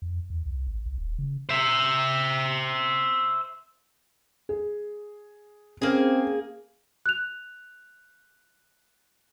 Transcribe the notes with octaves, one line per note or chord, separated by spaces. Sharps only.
F2
E2
C2
G#1
C2
D#1
C#3
C5 E5
G#4
A#3 C4 C#4 G#4
F#6 F7